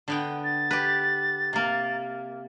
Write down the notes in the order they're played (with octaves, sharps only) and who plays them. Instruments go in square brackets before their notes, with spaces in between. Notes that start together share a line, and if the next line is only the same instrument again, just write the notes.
[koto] D3 B3 G5
[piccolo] A6
[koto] G4 B4
C3 A#3